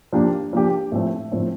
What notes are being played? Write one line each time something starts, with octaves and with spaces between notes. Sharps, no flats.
F3 A#3 D4 G4
F3 A#3 D4 G4
A2 F3 A3 C4
A2 F3 A3 C4